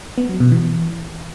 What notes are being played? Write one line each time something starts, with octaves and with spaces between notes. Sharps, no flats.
B3
F#3
B2
E3